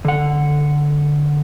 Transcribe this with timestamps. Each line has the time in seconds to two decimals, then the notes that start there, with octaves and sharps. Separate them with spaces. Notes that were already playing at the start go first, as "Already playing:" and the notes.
0.05 D3 F#5